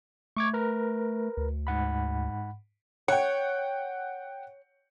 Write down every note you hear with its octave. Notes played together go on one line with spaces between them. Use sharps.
A3 C#6 D6 G#6
A#4 B4
D2
G#2 F#5 B5
C#5 F#5 G5